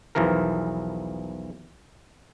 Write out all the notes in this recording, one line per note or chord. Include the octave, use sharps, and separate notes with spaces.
B1 E2 E3 F3 A#4